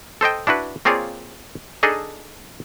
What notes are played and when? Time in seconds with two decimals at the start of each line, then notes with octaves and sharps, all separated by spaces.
0.21 A4 C5 D#5 G5
0.47 D4 E4 F#4 B4
0.85 A#3 C4 F4 G#4 C#5 D5
1.83 D4 D#4 G#4 A4 D#5